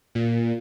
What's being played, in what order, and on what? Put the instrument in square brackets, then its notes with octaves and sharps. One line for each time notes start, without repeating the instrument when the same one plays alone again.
[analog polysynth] A#2